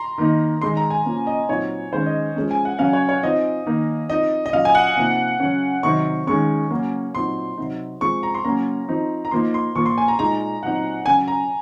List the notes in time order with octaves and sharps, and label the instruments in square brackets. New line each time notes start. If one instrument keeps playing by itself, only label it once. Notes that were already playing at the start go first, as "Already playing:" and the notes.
Already playing: [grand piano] A#5 C6
[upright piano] D#3 A#3 D#4
[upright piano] D#3 G#3 D#4 [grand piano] C6
[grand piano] A#5
G#5
[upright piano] C#3 F3 A#3 C#4
[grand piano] D#5
[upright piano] A#2 F#3 C4 D#4 [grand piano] C#5
[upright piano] D#3 G#3 C#4 [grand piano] C5
[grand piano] D#5
[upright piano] F3 G#3 C#4
[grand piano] G#5
F#5
[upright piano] C#3 F#3 C#4 [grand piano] F5
[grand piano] C#5
C#5
[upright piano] F3 C4 D#4 [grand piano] D#5
[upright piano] D#3 A#3 D#4
[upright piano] F3 C4 D#4 [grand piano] D#5
[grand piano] D#5
[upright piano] A#2 F#3 C#4 [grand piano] F5
[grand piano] G#5
F#5
[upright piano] C3 F3 A#3 D#4
C#3 F#3 C#4
[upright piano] C3 D#3 F#3 C4 D#4 [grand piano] C#6
[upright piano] D#3 G#3 C#4 [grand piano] C#6
[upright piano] C#3 F#3 A#3 C#4
[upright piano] A#2 F#3 C4 D#4 [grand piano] C6
[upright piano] C3 F#3 C4 D#4
[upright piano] F3 G#3 C4 [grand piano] C#6
[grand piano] A#5
C6
[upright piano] C#3 F#3 A#3 C#4 [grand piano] A#5
[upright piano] F3 C4 D#4
[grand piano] A#5
[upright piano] F3 A#3 D#4 [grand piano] C6
[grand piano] C6
[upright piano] A#2 F3 A#3 [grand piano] C#6
[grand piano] C6
G#5
A#5
[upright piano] A#2 G#3 D#4 [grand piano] A#5
[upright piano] A#2 F#3 C4 D#4 [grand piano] F#5
[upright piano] C#3 F#3 C#4 [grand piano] G#5
[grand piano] A#5